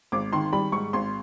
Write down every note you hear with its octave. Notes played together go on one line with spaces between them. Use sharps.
G#1 D6
D#3 C6
G3 B5
G#2 C#6
G#1 C6